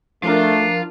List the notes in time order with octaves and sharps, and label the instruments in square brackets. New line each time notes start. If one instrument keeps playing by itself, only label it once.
[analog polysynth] F3 A#4 [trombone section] A3 [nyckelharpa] D4 [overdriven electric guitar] F4